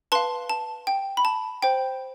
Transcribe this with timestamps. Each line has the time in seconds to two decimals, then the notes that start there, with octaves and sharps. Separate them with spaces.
0.12 B4 F5 A5 C6
0.50 A5
0.87 G5
1.17 B5
1.25 A5
1.62 C5 G5